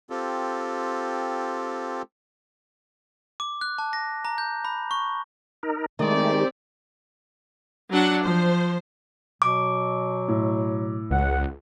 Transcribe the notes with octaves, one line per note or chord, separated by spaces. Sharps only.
C4 F4 G4 A4
D6
F#6
A5
A#6
A#5
G6
B5
C#6
D#4 A#4
D#3 G#3 A3 C4 G4 D5
F#3 D4 F#5
F3 C5
B2 F#3 D6
A2
C#2 F#5